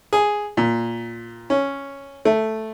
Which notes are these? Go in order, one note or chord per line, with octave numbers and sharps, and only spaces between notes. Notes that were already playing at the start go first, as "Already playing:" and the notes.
G#4
A#2
C#4
A3